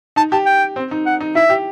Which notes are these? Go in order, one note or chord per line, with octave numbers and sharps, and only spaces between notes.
D#4 A5
G4 A5
G5
C4
D#4
F#5
D#4
E4 E5
G4